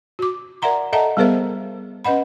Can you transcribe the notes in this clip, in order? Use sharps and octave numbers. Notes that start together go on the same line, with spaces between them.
F#4 D6
A#4 D5 E5 F#5 A#5 C6
A4 D#5 E5 F#5 A5 A#5
G3 B3 G#4 A#4 C5 E5
C#4 B4 D#5 F#5 B5